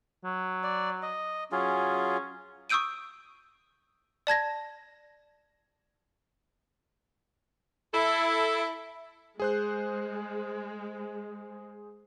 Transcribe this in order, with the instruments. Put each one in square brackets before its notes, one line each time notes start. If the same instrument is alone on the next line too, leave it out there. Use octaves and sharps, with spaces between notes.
[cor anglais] F#3
[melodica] D5
D#5
[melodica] F#3 F4 G#4 [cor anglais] C#4
[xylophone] C#6 D#6 E6 G6 D7 D#7
D5 A5 G#6 A#6
[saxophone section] E4 A4
[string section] G#3 [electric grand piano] G#4 C5 F#6